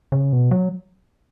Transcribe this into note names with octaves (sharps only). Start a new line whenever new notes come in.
C#3
B2
F#3